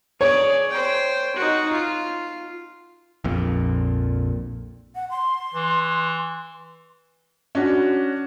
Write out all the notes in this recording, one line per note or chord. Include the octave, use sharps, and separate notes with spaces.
G#4 C#5 D5
C5 G5
D#4 F#4
F4
A#1 F2 A#2
F#5
C6
E3
C#4 D4 F#4